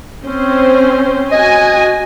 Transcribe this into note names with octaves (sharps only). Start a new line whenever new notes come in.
C4 C#4 C5
F#4 D#5 G#5